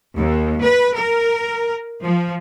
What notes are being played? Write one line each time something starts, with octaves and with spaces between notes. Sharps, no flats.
D#2
B4
A#4
F3